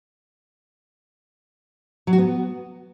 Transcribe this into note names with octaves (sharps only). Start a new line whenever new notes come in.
F#3
F#4
B3